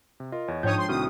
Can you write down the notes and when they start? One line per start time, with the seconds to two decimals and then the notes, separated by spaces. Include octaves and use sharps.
0.20 C3
0.32 F4 A#4 D#5
0.48 E2 C#5
0.63 G#2 F3 G#3 D4 C#5 G5 D#6 G6
0.77 C6
0.89 C2 A2 D#3 C4 F#4 D#6 F6